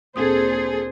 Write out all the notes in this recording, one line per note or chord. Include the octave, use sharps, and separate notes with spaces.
D2 A#2 C4 G#4 A4 C5 D#6